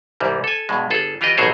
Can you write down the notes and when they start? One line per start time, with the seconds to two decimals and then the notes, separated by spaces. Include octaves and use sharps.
0.20 C2 G#2 E3 G3
0.44 A4 G#5
0.69 G2 B2 G#3
0.90 G1 G#4 A4
1.21 E3 F4 G4 B4 D#5
1.37 A1 B2 F#3 G#4 C5 C#5